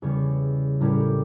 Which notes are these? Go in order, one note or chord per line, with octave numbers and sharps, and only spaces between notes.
E2 C#3 G3 C#4 C#5
A2 G3 C#4 E4 A#4
G4